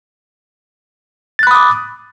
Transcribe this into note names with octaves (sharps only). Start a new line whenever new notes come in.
B5 D6 D#6 F#6 A6